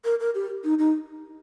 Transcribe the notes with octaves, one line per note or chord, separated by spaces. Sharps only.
A#4
A#4
G4
D#4
D#4